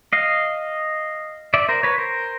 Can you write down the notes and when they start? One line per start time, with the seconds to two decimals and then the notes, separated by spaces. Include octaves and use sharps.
0.13 D#5 F5
1.54 D5 E5
1.69 A#4 C5
1.83 B4 C#5
1.98 A#4 C5